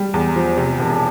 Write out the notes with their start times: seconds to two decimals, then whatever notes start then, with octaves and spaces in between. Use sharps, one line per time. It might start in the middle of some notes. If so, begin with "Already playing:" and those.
Already playing: G3
0.14 E2
0.36 F3
0.58 C3
0.79 E1